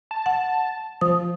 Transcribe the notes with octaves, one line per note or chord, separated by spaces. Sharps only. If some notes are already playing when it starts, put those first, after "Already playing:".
A5
F#5
F3 D#6